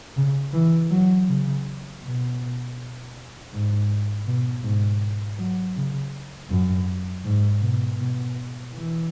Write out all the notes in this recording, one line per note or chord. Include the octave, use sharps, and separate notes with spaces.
C#3
E3
F#3
C#3
B2
G#2
B2
G#2
F#3
C#3
F#2
G#2
B2
B2
E3